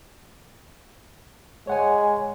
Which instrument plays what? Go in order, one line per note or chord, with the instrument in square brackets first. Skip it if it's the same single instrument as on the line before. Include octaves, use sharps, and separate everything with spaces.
[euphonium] G#3 [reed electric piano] C#5 F#5 G#5